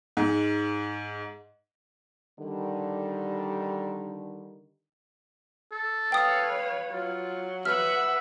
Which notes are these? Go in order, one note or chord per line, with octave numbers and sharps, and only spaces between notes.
G#2
D3 D#3 G3
A4
B4 C#5 F5 G5 D#6
F#3 F4
B4 E5 F#5 F6